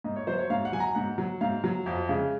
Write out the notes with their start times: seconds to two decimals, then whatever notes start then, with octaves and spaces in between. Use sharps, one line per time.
0.04 G#2 D#5
0.16 C#5
0.27 F#3 C5
0.39 C#5
0.50 G#2 F5
0.65 F#5
0.72 F#3 G#5
0.80 A#5
0.95 G#2 F#5
1.18 F#3
1.41 G#2 F5
1.64 F#3
1.86 F2
2.09 C#3 G#3